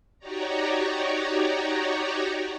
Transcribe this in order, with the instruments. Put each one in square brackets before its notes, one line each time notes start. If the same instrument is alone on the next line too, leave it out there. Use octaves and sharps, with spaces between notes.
[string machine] D#4 F#4 G4 C#5 D5 A#5